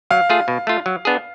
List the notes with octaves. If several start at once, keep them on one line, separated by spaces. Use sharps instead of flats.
F#3 F5
A3 F4 G#4
B2
A3 F4
F#3
B3 D4 G#4